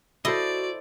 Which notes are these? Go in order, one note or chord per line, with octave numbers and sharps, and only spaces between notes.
E4 F#4 A4 C5 D5 D#5